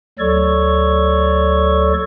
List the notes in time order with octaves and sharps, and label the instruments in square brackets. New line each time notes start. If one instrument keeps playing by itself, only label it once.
[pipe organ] D2 F#3 A4 C#5 D5 C#6